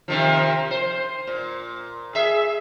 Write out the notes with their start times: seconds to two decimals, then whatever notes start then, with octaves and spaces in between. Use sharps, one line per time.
0.08 C3 D#3 F3
0.71 C5
1.27 A#2
2.15 G#4 E5